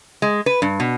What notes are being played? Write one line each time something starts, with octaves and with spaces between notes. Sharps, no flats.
G#3
B4
G2
B2